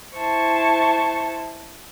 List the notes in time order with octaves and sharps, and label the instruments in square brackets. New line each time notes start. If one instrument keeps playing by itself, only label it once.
[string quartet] E4 C5 A5 C#6